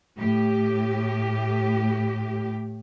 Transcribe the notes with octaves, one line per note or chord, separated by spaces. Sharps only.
A2 G4